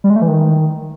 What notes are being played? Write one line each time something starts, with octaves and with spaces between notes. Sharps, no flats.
G3
G#3
A3
E3
D#3